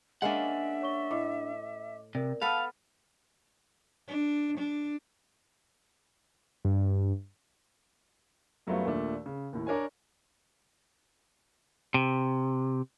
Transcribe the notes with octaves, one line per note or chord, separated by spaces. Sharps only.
G#3 A#3 C#4 D4 E5 F#5
C#5 C#6 G7
A2 D#5 D6
C3 A#4 D5
B3 A4 B4 F5 A5 B5 F6
D4
D4
G2
F#2 F#3 G3 A3 B3 F4
D#2 A#2 A3 D4
C#3
D#2 A2
D4 A#4 C#5 G#5
C3